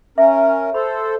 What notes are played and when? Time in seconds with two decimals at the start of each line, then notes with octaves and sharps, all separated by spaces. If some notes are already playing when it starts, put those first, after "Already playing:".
0.18 C#4 A#4 E5
0.74 A4 C5 B5